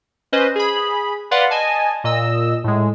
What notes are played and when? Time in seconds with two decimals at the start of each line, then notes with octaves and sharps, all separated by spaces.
0.32 C#4 B4 C5 D#5
0.55 G#4 B5
1.31 B4 D5 F5 F#5 C6
1.50 D#5 G#5 A5
2.04 A#2 D#5 E6
2.64 A2 G#3